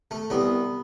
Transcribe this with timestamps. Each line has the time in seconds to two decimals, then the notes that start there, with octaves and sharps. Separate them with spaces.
0.11 A3
0.30 C2 B3